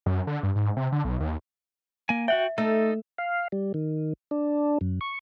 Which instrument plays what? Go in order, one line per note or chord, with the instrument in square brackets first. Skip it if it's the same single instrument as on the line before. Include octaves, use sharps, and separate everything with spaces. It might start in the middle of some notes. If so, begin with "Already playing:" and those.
[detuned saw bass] F#2
D3
G2
G#2
C3
D3
B1
D#2
[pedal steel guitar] A#3 G#5
[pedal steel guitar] F#4 F#5 G5 [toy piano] E5
[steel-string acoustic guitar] A3 [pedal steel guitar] D#4 A4
[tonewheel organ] F5
G3
D#3
D4
F#2
C#6